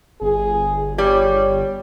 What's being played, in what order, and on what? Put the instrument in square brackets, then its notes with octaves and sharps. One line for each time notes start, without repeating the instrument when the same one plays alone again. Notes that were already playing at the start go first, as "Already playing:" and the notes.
[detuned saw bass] G1 [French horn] G#4
[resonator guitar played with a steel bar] G3 [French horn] C#5